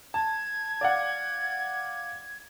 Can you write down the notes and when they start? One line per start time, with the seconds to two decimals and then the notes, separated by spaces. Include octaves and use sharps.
0.14 A5 G#6
0.81 D5 F5 F#5